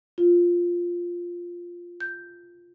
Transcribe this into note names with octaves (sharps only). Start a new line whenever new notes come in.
F4
G6